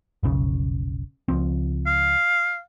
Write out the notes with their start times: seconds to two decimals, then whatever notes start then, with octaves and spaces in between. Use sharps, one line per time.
0.23 F1 B1 C#3
1.28 C#2 F3 C4
1.87 F5